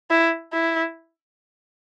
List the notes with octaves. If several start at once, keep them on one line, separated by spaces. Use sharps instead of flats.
E4
E4